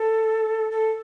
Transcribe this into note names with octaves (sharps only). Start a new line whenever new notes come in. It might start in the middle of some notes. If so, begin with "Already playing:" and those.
Already playing: A4
A4